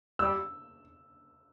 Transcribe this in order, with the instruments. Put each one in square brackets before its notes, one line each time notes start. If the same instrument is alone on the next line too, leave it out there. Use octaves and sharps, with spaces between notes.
[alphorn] G3 [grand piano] E6